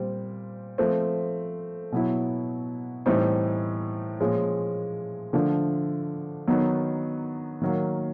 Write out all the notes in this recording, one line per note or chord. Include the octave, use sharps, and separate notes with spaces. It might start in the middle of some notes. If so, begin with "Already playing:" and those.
Already playing: A#2 G3 C4
F3 A3 C4
B2 F#3 B3 E4
A2 E3 G3 C4 D#4
A#2 F3 G#3 C#4
D3 F3 A3 D4
D#3 F#3 B3 D#4
D#3 F#3 A#3